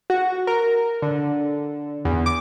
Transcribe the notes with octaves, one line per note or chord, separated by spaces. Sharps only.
F#4
A#4
D3
E2
D6